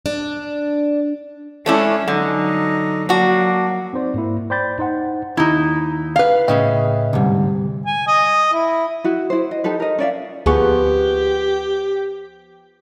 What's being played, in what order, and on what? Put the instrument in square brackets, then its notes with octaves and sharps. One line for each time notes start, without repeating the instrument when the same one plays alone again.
[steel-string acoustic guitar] D4
[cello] G#3 C#4 [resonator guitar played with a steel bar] A3 D4 E4
[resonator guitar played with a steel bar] D3 [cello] F#3 D#4
[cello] F#3 A#3 [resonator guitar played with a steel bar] D4 F#4
[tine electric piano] C4 D#4 C5 D5
G#2 A#3 E4
C5 D5 G5 B5 G6 A6
D#4 C5 F#5 G5
[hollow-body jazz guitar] D#2 [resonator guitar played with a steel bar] D#4 E4
[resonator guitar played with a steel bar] B4 F5
[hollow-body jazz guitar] A2 C#3 C#4 [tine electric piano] D#5 E5 G5
[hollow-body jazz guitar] D2 G#2 [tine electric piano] C3 G3
[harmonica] G#5
D#5
E4
[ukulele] E4 F#4
E4 C5
D#5
D#4 G4 A4 B4
A#4 D#5
C#4 D5 E5 F5
[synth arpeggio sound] D2 G#4 C#6 [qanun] F3 B3 B4 [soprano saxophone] G4